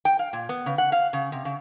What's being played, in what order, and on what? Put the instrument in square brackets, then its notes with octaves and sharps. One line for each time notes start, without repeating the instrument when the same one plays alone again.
[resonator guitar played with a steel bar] G5
F5
A#2
B3
C#3
F#5
F5
C#3
C3
C#3